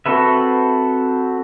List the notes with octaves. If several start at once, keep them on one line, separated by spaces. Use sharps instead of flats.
C4 F#4 A4 B4 E5